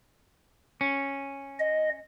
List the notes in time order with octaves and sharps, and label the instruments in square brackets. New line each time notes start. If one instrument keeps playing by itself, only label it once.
[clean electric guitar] C#4
[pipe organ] D#5